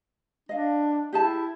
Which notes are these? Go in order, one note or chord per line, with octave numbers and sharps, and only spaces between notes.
D4 D#5 F5
E4 G4 G#4 A5